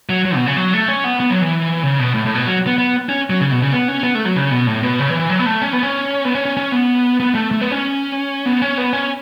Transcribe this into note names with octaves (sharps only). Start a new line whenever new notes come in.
F#3
F#3
B2
C#3
F#3
A3
C#4
B3
B3
F#3
E3
C#3
B2
A2
A2
B2
F#3
B3
B3
C#4
F#3
C#3
B2
C#3
B3
C#4
B3
A3
F#3
C#3
B2
A2
B2
C#3
E3
E3
F#3
B3
A3
C#4
B3
C#4
B3
C#4
C#4
C#4
B3
B3
A3
A3
B3
C#4
B3
C#4
B3
C#4